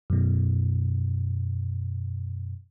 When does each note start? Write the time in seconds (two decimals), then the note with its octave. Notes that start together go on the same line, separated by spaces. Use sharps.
0.10 F#2 B2